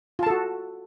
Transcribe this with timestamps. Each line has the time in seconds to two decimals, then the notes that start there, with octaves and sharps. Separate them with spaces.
0.19 F4
0.23 A5
0.27 A4
0.30 F#4